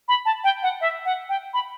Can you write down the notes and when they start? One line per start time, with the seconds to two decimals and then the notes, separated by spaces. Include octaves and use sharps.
0.08 B5
0.25 A5
0.44 G5
0.63 F#5
0.81 E5
1.05 F#5
1.29 G5
1.54 B5